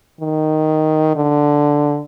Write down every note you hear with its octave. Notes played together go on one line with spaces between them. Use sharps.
D#3
D3